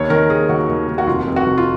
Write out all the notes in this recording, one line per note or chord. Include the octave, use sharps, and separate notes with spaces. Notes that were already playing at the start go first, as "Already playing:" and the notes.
Already playing: D#2 C#5
D#3 A#4
D#2 G#4
D#2 F#4
D#2
D#2
F#4
F1 F4
F1
F#4
F1
F4